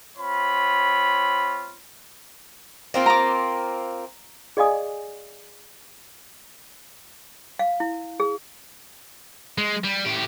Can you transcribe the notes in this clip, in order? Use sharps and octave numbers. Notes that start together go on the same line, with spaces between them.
C4 F4 C#5 B5
A#3 C4 F4
A#5 D6
G#4 D5 D#5 F5 G#5 D#6
F5
E4
G#4
G#3
G3
A2 G4